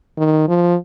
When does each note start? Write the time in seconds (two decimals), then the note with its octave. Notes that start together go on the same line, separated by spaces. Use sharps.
0.17 D#3
0.48 F3